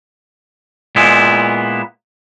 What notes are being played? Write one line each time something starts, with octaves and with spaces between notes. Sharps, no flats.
A#2 G#3 B3 E4